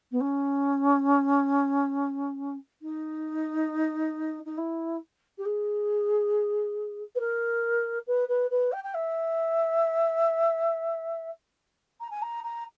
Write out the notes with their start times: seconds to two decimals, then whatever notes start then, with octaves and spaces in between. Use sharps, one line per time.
0.11 B3
0.20 C#4
2.82 D#4
4.46 D#4
4.57 E4
5.38 G4
5.45 G#4
7.15 B4
7.20 A#4
8.07 B4
8.28 B4
8.50 B4
8.72 G5
8.84 G5
8.94 E5
12.00 A#5
12.10 G#5
12.22 A#5
12.44 A#5